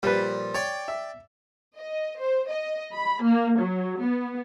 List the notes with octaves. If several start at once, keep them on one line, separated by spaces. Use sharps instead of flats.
A#2 F3 G3 B4
C#5 D5 G5
E5
D#5
C5
D#5
B5
A#3
F#3
B3